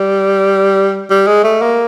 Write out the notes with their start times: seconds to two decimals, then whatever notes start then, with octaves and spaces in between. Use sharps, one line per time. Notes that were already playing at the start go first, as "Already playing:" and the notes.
Already playing: G3
1.10 G3
1.27 G#3
1.44 A3
1.62 A#3